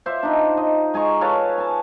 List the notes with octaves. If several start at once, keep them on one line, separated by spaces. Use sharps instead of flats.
F4 C5 D5 E5
D4 D#4
D#5
G#3 G#4 A#5 C#6
A4 B4 C#5 F5
G#5 A5